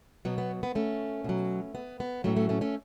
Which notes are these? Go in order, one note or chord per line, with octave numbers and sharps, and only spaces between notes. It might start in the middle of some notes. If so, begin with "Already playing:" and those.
B2 F#3 B3
B3
B3
A3 C#4
B2 F#3
B3
B3
A2 F#3 A3 C#4
A3 C#4
A3 C#4
A3 C#4